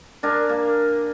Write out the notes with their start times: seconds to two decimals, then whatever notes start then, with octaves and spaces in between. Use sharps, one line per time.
0.23 D4 A#4 G#5
0.49 A#3